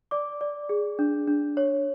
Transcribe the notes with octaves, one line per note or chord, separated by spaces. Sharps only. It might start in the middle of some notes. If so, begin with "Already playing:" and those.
D5 D6
D5
G#4
D4
D4
C#5